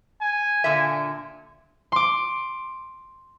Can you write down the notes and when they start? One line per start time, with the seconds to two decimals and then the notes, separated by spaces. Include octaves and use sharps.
0.22 G#5
0.64 A#2 D3 E5
1.92 C6 D6